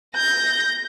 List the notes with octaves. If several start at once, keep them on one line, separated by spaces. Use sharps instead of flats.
G6 A#6